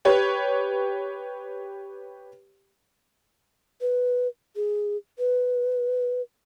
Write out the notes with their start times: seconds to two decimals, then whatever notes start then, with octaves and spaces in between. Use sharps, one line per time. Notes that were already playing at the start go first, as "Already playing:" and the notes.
0.05 G4 B4 C#5
3.81 B4
4.56 G#4
5.19 B4